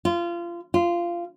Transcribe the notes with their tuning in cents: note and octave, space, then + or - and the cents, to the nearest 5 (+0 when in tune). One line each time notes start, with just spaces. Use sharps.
F4 -25
F4 -15